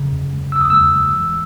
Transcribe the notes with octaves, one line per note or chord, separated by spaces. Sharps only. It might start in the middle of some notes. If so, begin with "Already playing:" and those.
Already playing: C#3
F#2
G#3
F#2 E6
D#6
G#3 E6
G#3
E3